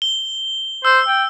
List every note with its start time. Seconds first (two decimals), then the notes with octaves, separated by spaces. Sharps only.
0.02 G7
0.85 C5 E6
1.08 G5